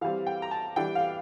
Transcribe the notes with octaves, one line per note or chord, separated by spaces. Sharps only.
E3 G3 C4 F5
G5
A#5
A5
E3 G3 D4 G5
F5